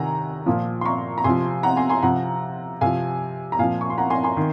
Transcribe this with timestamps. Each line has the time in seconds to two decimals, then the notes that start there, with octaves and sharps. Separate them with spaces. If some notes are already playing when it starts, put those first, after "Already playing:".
Already playing: C3 D#3 F#5 G#5 A#5
0.46 A#2 F3
0.81 C6
0.85 A#5 C#6
1.18 A#5
1.24 C3 F3 G#5 C6
1.63 F#5 A#5
1.77 G#5 C6
1.89 G#5 C6
2.03 C3 F3 F#5 A#5
2.81 C3 F3 F5 G#5
3.52 A#5
3.59 A#2 F3 F5 G#5
3.81 C#6
3.90 C6
3.98 F#5 A#5
4.10 G#5 C6
4.24 G#5 C6
4.37 D#3